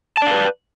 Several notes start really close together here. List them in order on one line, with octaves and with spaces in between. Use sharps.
A5 D5 F5 B4